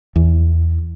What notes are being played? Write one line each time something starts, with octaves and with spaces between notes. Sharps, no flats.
E2